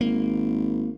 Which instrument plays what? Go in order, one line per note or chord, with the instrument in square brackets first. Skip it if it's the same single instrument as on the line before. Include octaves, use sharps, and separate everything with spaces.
[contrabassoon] G#1 [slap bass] A#3